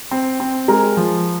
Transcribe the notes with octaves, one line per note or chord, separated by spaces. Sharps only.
C4
C4
G#3 A#4 A#5
F3